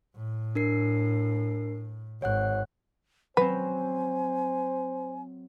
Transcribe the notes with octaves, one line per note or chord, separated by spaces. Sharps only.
A2
D4 A#4 C7
G#1 C#5 F#5 F#6
F#3 C4 B4 C5 G#5